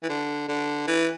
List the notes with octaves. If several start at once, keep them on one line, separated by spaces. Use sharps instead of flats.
E3
D3
D3
E3